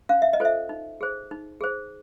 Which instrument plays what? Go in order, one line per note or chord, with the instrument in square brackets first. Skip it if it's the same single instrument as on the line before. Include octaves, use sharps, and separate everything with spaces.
[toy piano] C#4 F5
E5
D#5
F4 A4 C5 E5
D#4
G#4 C5
D#4
G#4 C5